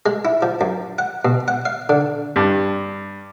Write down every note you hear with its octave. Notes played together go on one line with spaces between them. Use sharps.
G#3
E4
F3
F#2
F#5
B2
F#5
F5
D3
G2